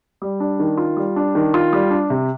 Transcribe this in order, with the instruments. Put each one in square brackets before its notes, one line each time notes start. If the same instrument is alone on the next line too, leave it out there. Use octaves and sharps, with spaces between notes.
[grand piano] G3
D4
D#3
F4
G3
D4
D#3
F4
G3
D4
C3